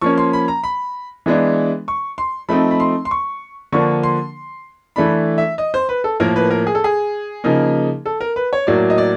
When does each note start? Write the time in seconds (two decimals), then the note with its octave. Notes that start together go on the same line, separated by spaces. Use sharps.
0.01 F3 A#3 C#4 C#6
0.18 C6
0.33 B5
0.48 A#5
0.64 B5
1.26 E3 G#3 B3 D4
1.88 C#6
2.18 C6
2.49 F3 A3 C4 D#4 B5
2.71 B5
2.80 C6
3.05 C6
3.11 C#6
3.73 D3 F3 A#3 D4 C#6
4.03 C6
4.96 E3 A3 D4 B5
5.38 E5
5.58 D#5
5.74 C5
5.89 B4
6.04 A4
6.20 A2 F3 A#3 A#4
6.36 B4
6.51 A#4
6.67 G#4
6.75 A4
6.84 G#4
7.44 C#3 F3 A#3 D#4
8.06 A4
8.21 A#4
8.36 B4
8.53 C#5
8.67 A2 F#3 A#3 D5
8.90 D#5
8.98 D5